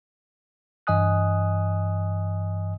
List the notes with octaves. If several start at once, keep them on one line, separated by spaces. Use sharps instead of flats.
G2 E3 D#5 G#5 D#6 F#6